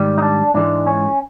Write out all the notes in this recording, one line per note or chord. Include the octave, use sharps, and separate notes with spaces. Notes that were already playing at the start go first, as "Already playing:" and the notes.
Already playing: G#2 D#3 G3
D#4
D4
G#2 E3 G#3 D4
C#4